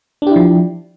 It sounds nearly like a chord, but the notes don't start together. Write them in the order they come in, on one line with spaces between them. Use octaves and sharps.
D4 G4 E4 F3